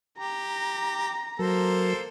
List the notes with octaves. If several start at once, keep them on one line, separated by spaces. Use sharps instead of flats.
G4 A#5
F#3 A#3 A4 A#4 C5